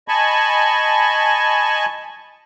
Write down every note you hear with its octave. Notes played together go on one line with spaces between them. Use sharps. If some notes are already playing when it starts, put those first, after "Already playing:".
D#5 G#5 A5 B5 C#6